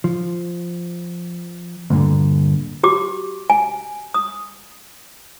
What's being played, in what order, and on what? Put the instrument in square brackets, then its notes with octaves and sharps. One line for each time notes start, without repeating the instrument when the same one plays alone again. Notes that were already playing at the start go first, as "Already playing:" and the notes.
[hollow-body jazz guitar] F3
D2 G2 A#2 D3
[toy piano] F#4 G4 D6
G#5
D#6